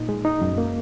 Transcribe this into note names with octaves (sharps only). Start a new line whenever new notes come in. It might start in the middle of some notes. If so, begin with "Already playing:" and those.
Already playing: A#2 D#4
G#3
D#4
F#2
A#3